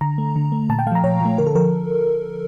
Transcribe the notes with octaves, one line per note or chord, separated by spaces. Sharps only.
D3 A#5
A3
D3
A3
A#2 A5
G5
F3 A3 F5 A#5
A#2 C#5
F3 A3
D3 A#4
A4
F3 A#4